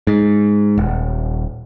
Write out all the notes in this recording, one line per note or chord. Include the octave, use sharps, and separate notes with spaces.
G#2
D#1